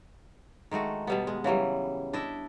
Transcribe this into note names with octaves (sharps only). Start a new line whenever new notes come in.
D#3 G#3 A3 F#4
B2 G3 B3
G#3
C#3 E3 F#3 G3
D4 E4 D#5 E5